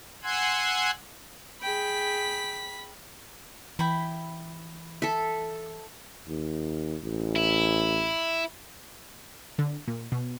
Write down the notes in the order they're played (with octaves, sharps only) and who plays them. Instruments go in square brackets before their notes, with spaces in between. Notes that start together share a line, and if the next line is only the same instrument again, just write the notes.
[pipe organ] F#5 G#5 C6 E6 F#6 G#6
[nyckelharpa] G#4 G5 [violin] B5 B6
[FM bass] E3 [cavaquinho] E4 G5 B5
[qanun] A4 E5
[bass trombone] D#2
A1
[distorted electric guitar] E4
[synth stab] D3
A#2
B2